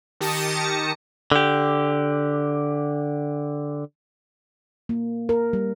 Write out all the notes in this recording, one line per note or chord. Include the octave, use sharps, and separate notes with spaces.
D#3 G4 A5 D#6 A#6 C#7
D3 G4
A#3
A#4
G3